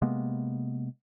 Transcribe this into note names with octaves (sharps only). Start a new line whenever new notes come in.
C3 G#3 A#3 B3